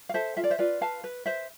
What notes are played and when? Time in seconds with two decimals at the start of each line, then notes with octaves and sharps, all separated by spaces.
0.09 F5
0.14 A4 C5 E5
0.37 F4 E5
0.44 D5
0.50 C5 E5
0.59 F4 B4 D5
0.81 B4 F5 A5
1.04 B4
1.26 B4 C5 E5